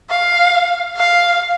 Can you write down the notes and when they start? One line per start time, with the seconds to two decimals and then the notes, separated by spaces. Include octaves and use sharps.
0.10 F5
0.97 F5